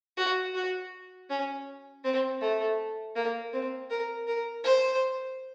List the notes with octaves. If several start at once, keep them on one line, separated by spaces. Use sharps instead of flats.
F#4
F#4
C#4
C4
A3
A#3
C4
A#4
A#4
C5